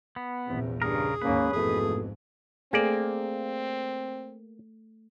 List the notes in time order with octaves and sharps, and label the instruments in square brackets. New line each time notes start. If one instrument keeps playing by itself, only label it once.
[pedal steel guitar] B3
[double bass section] A#1 E2 [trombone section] C3
[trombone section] G2 [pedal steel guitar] C#3 A#4 [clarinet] G#4
[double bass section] D#2 G#2 [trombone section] A#3 C#4 [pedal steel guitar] B4
[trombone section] A1 B2 A3 [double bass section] F2 G#2 [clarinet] G#4
[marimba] A3 A4 [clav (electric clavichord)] A#3 D5 [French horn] C4 [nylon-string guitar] G#4